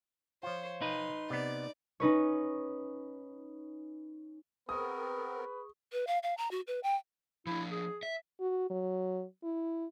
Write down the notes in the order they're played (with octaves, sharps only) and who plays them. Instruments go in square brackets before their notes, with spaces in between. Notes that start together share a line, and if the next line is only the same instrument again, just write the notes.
[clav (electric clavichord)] F3 F4 [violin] C5 C#5
[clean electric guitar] D#4 B4 [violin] C6
[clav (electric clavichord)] C3 B3 [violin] D5
[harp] C#4 D#4 B4 C#5
[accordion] B3 C4 A#4 [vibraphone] G#4 C#6 [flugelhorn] B4 [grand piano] D#6
[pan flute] B4
F5
F5
A#5
F#4
B4
G5
[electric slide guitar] F3 D4 [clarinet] E4
[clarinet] G#4
[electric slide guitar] E5
[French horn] F#4
F#3
E4